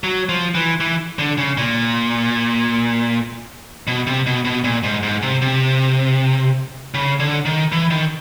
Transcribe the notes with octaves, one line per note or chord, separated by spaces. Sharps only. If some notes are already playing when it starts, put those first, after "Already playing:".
F#3
F3
E3
E3
D3
C#3
A#2
B2
C3
B2
B2
A#2
G#2
G#2
C3
C3
C#3
D3
D#3
E3
D#3